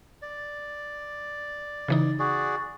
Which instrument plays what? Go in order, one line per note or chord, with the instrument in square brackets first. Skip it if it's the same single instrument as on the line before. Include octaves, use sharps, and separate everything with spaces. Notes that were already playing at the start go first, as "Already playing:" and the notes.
[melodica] D5
[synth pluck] C#3 E3 D#4
[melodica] F#4 G#4 D5